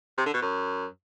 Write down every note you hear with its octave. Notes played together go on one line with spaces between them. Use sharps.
C3
D3
B2
F#2